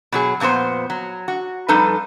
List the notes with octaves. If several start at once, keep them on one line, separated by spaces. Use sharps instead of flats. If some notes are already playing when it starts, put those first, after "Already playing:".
B2 F#3 G#4
F2 A#2 E3 B3 C5
F#3
F#4
F2 G3 D#4 A4 B4